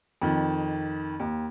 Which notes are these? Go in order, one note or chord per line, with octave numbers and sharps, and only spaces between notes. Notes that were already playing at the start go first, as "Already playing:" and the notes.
F2 D#3
D#2